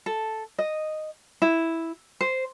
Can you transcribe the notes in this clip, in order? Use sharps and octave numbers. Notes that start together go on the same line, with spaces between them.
A4
D#5
E4
C5